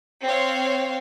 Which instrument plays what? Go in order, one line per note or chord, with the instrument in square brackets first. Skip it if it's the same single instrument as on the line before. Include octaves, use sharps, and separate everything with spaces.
[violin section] C4 C#5 F5